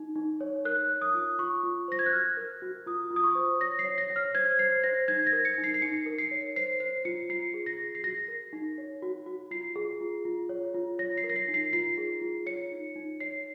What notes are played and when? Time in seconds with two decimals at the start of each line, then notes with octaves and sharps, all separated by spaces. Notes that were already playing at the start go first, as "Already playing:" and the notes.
Already playing: D#4
0.16 D#4
0.41 C#5
0.65 A#4 F#6
0.90 C#5
1.02 D#6
1.14 F4
1.39 F4 C#6
1.63 F4
1.88 C5 A#6
1.99 G#6
2.06 F#6
2.13 F#4 F6
2.37 A#4
2.62 F#4
2.86 F4 D#6
3.11 F4
3.16 D#6
3.24 C#6
3.35 C5
3.60 C#5 A#6
3.79 C7
3.85 C#5
3.98 A#6
4.10 C#5
4.16 F6
4.34 C5 G#6
4.59 C5 C7
4.83 C5 A#6
5.08 D#4 G#6
5.27 A#6
5.33 A#4
5.45 C#7
5.58 D#4
5.64 C7
5.74 C7
5.82 D#4 C#7
6.06 A#4
6.18 C7
6.31 C#5
6.56 C5 C7
6.80 C5 C7
7.05 F4 C#7
7.29 F4 C7
7.54 G#4
7.66 A#6
7.78 G#4
7.95 C7
8.03 F#4 A#6
8.28 A#4
8.53 D#4
8.78 C#5
9.03 F#4
9.26 F#4
9.51 F4 C7
9.76 G#4
10.01 F4
10.25 F4
10.49 C#5
10.74 F4
10.99 C#5 A#6
11.17 C7
11.24 A#4
11.30 A#6
11.36 C7
11.48 D#4
11.54 C7
11.73 F4 C7
11.98 G#4
12.21 F4
12.46 C#5 C#7
12.72 D#4
12.96 D#4
13.20 C#5 C7